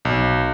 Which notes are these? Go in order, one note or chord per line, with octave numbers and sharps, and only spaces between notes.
B1